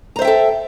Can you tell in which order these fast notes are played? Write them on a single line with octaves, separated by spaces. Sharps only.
A#5 C5 E5 G5 A4